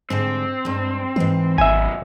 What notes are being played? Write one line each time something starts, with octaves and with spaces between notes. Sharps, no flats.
G#2 D3 G3 C4
G2 G#3
G#2 E3 B4
G#1 F#2 B2 E5 G#5